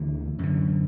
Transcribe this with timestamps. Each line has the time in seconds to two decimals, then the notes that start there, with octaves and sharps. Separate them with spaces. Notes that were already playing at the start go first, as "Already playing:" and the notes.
Already playing: D2 D3 E3
0.39 F#2 D3